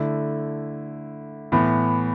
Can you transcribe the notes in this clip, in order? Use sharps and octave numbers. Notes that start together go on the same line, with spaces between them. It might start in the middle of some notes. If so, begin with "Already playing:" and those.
Already playing: D3 A3 E4
A2 E3 B3